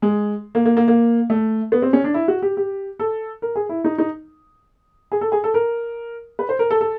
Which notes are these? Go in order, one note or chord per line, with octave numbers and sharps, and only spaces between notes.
G#3
A#3
A#3
A#3
A#3
A3
B3
C4
C#4
D4
E4
F#4
G4
G4
A4
A#4
G#4
E4
D#4
D#4
G#4
A4
G#4
A4
A#4
B4
C5
A#4
A4
A4